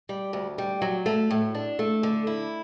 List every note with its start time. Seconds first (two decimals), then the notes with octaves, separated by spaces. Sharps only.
0.09 G3
0.33 D2
0.58 G3
0.82 F#3
1.06 A3
1.31 A2
1.55 D4
1.79 A3
2.03 D3
2.27 E4